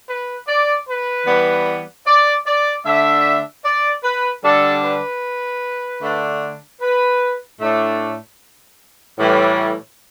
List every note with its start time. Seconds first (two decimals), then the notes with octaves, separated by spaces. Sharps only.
0.09 B4
0.47 D5
0.88 B4
1.26 E3 G3 B3
2.06 D5
2.46 D5
2.85 D3 A3 D4 E5
3.65 D5
4.03 B4
4.44 D3 G3 D4 A4
4.83 B4
6.02 D3 A3 D4
6.81 B4
7.61 A2 A3 D4
9.19 A2 E3 G3